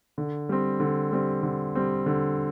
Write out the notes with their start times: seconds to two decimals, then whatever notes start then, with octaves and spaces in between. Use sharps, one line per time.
0.18 D3
0.49 G3 C4
0.80 D3
1.12 G3 C4
1.43 D3
1.75 G3 C4
2.06 D3